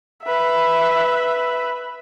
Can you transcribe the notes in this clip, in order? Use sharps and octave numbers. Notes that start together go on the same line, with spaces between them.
B4 E5